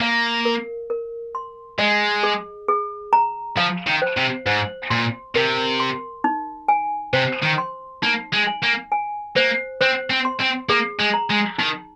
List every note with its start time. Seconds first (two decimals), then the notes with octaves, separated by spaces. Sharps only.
0.01 A#3 F5
0.45 A#4
0.90 A#4
1.35 C6
1.79 G#3 D#5
2.23 G#4
2.68 G#4
3.13 A#5
3.57 F3 F5
3.87 D#3
4.02 C5
4.17 C3
4.46 G#2 C5
4.90 A#2 C6
5.35 C3 A#4
5.80 C6
6.24 D#4
6.68 G#5
7.13 C3 C5
7.43 D#3
7.58 C6
8.02 A#3 D#4
8.32 G#3
8.47 G#5
8.63 A#3
8.92 G#5
9.36 A#3 C5
9.81 C4 C5
10.10 C4
10.25 C6
10.40 C4
10.69 A#3 G#4
10.99 G#3
11.14 A#5
11.30 G#3
11.58 D#3 D#4